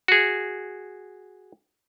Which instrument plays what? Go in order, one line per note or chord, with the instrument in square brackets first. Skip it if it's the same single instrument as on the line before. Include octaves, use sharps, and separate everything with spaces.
[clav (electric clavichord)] F#4 G#4